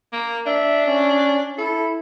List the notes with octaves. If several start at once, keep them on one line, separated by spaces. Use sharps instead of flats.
A#3
D4 E5
C#4
E4 A4